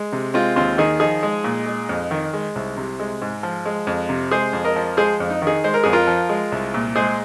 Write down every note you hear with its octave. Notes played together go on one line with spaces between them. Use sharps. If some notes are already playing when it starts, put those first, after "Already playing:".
Already playing: G#3
C3
G#3 C4 F4
D#2 C4 F4
D#3 D#4 G#4
F3 D#4 G#4
G#3
A#2
G#3
F2
D#3
G#3
C2
C3
G#3
G#2
F3
G#3
F2
C3
G#3 G#4 C5
F2
A#4 D#5
F3
G#3 G#4 C5
F2
D#4
D#3
D#4 G#4
G#3 C5
A#4
F2 G#4
F4 A#4
F3
G#3
C2
A#2
G#3 G#4 C5